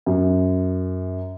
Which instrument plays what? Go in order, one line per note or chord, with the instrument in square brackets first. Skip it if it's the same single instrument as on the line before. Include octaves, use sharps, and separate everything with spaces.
[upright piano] F#2